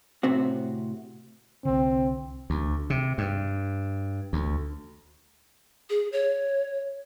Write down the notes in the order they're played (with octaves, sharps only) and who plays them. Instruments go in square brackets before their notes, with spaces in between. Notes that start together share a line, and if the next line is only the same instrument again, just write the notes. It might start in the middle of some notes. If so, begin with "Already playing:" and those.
[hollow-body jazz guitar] A2 C3 C4 F#4
[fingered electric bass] C2 D3 [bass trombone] C4
[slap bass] D2
C3
G2
D2
[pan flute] G#4
C#5